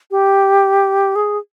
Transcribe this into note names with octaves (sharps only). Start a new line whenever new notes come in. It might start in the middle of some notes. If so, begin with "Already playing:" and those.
G4
G#4